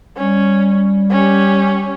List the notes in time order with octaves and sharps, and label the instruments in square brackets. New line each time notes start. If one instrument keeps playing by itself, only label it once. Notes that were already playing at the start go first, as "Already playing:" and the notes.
[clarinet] G3 [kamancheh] C#4
[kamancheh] C#4 G4